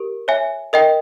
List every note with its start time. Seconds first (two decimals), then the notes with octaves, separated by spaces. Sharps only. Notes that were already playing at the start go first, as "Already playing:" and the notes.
Already playing: G4 A#4
0.28 C#5 E5 G#5
0.73 A#4 D#5 G5